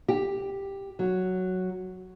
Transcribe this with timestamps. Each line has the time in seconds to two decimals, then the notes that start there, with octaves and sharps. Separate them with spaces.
0.08 G4
0.99 F#3